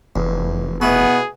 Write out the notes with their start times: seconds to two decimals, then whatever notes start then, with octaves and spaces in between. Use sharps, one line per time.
0.16 F1 E2
0.81 B2 B3 E4 F#4 G#4